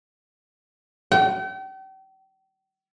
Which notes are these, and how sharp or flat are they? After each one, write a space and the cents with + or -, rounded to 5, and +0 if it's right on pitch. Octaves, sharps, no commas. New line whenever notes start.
G5 -40